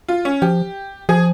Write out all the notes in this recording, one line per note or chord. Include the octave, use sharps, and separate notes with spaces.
F4
C#4
F3 G4
F3 G#4